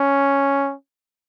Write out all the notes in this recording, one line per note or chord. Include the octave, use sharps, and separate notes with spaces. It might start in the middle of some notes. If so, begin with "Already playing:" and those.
Already playing: C#4